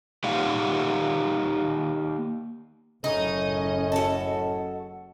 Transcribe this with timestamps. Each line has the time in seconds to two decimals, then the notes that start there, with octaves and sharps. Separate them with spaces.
0.24 A#3 D#4 G4 D5 F5 F#5
3.04 F#1 F#2 A2 C#4 D#4 D#5
3.92 F#4 A4